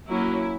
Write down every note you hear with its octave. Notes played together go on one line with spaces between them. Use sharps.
F#3 A#3 C#4 E4